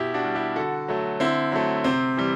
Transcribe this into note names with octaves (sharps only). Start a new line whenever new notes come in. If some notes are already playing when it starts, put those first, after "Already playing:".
Already playing: B2 E4 G4
D4 F#4
G3
E4 G4
D3 F#4 A4
F#3 A3
D3 C4 E4
F#3 A3
C3 C4
E3 G3